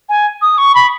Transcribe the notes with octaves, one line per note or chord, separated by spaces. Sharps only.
G#5
D#6
C#6
B5